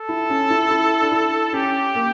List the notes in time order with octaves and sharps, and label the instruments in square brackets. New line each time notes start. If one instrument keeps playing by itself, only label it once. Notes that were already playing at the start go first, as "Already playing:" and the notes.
Already playing: [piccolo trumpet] A4
[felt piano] E4
C#4
E4
E4
D4
E4
[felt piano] C#4 [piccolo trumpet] G4
[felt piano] A#3